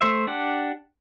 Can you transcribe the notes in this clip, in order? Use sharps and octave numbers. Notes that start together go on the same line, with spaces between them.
A3 C5 E5
D4 G4 F#5